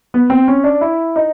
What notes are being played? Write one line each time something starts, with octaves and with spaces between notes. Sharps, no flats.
B3
C4
C#4
D4
E4
D#4